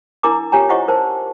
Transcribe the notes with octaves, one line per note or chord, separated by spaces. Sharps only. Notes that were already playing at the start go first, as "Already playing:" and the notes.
D4 E4 A#4 A#5 D6
C#4 F4 G4 C#5 G#5 A#5
E4 F4 C5 D#5 F#5 C#6
A#4 C5 A5